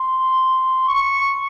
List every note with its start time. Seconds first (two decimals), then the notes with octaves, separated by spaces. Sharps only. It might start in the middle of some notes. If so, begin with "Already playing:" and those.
Already playing: C6
0.88 C#6